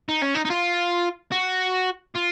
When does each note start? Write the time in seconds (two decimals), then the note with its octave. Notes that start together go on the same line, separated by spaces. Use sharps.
0.08 D#4
0.22 C#4
0.34 D#4
0.45 D#4
0.50 F4
1.31 F#4
2.15 F4